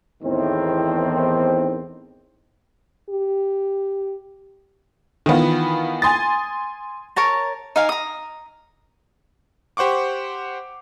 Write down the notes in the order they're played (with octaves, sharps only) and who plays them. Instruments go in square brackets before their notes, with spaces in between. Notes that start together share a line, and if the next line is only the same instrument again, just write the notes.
[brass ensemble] E2 A2 D#3 C4
[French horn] G4
[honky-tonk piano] D#3 E3 B3 F4
G#5 C6 D#6 A6
[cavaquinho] A#4 C#5 A5 A#5
D#4 A#4 F5 G#5
A#5 D#6
[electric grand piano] G4 C5 F#5 C#6 D6